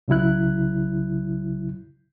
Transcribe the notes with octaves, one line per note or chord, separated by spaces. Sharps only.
C2 C#3 F#3 E4 F#6